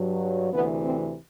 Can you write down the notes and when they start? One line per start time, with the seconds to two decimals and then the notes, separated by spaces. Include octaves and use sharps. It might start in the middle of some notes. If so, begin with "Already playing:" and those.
Already playing: G2 F#3
0.52 D2 C3 E3 B3
0.84 C4